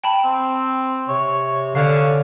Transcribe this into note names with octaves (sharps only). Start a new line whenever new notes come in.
G5 A5 B5
C4
C3 C#5
D3 C#4 C#5 D5 F5